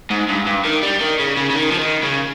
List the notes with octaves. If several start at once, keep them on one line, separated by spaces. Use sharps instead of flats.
G#2
G2
G2
D#3
G3
D#3
C#3
C#3
C#3
D#3
F3
D#3
C#3